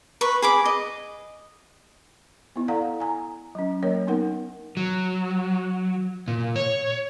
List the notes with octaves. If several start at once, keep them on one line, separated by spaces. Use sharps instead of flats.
B4 C#6
G#4 B5 D6
D#5
B3 E4
A4 D5 F5 F#5 A#5
G#5 A#5
F#3 C#4
F#3 A#3 A#4 C#5
B3 D#4 A#4 F#5
F#3
A#2
C#5